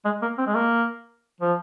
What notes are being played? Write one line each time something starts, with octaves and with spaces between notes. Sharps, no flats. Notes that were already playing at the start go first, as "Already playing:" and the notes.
G#3
A#3
C4
G#3
A#3
F3